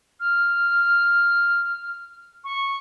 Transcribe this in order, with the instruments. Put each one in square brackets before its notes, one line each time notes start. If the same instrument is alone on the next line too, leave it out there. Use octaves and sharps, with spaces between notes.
[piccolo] F6
C#6